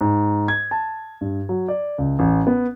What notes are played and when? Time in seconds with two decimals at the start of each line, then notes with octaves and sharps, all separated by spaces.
0.01 G#2
0.48 G#6
0.71 A5
1.21 G2
1.49 F#3
1.68 D5
1.98 C#2
2.19 A1
2.47 B3